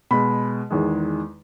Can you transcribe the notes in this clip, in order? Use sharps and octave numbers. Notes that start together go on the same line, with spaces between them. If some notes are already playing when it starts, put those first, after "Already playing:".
B2 G#3 B5
E2 D#3 G#3